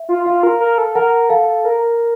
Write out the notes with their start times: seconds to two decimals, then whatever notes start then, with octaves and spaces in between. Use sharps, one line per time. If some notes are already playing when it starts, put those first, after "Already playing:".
Already playing: E5
0.09 F4
0.26 F4 F5
0.43 A#4
0.60 A#4
0.78 A4
0.95 A#4 F#5
1.29 A4 F5
1.65 A#4